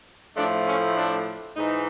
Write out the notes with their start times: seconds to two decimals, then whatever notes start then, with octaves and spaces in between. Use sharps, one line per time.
0.36 A2 F3 A3 D4
0.67 C#4
0.96 D4
1.57 G#2 E3 G#3 D#4